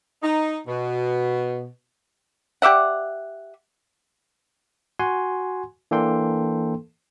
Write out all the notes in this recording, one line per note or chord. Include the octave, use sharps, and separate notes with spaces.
D#4
B2
G4 D5 E5 F#5
F#4 F#5 G#5 C6
E3 A#3 D4 A4 G5 C6